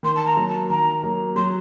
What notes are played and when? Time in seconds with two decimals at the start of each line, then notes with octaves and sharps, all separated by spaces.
0.03 D#3 C6
0.15 A5
0.26 A#5
0.37 F#3 A#3
0.48 A5
0.69 D#3 A#5
1.03 F#3 A#3
1.36 F#3 C6